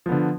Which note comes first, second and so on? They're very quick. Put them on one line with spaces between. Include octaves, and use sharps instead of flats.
F3 B3 D3